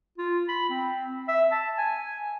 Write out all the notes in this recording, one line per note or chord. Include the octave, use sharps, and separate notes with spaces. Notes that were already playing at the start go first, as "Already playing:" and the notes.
F4
B5
C4
E5
A5
G#5